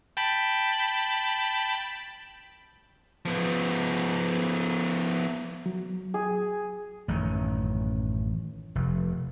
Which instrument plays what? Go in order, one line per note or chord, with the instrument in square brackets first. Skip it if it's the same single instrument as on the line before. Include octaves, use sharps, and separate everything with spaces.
[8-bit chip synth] G5 A5 B5
[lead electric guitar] F3 B3
[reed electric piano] F#3
[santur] G#4
[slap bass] A1 F#2 D#3
F1